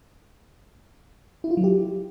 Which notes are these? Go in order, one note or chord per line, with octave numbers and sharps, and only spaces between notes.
E4
F4
F#3
G4